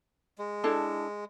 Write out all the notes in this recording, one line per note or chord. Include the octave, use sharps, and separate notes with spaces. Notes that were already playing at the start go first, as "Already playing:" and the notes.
G#3
D4 E4 A4